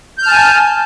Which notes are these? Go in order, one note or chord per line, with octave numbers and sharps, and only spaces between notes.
G#5 A5 F6 G6